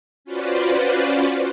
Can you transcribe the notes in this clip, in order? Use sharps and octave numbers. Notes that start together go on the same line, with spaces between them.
C#4 F4 F#4 B4 C5 D5